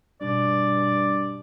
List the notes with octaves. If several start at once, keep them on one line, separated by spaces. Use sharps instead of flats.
G2 B2 D5